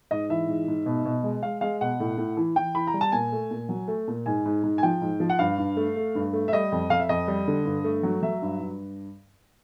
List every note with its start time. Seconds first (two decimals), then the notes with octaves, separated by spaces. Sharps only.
0.11 G#2 D#5
0.30 E3 E5
0.48 G#2
0.68 G#2
0.86 B2
1.05 B2
1.24 G#3
1.43 G#3 F5
1.61 G#3 F5
1.81 B2 F#5
2.00 A2
2.18 A2
2.37 E3
2.56 E3 G5
2.75 E3 B5
2.87 A#5
2.94 G3
3.01 A5
3.12 A#2 G#5
3.32 A3
3.51 A#2
3.69 F#3
3.88 A3
4.08 A#2
4.26 G#2 G#5
4.46 G#2
4.63 G#2
4.78 G#5
4.83 F3 G5
5.02 G#2
5.20 F3
5.30 F#5
5.39 G2 F5
5.58 G2
5.76 A3
5.96 A3
6.15 G2
6.33 A3
6.48 E5
6.53 G3 D#5
6.72 F2
6.90 F2 F5
7.00 E5
7.09 F2 D#5
7.28 G3
7.48 D3
7.65 G2
7.84 A3
8.03 F#3
8.22 F#3 E5
8.42 G2
8.61 G2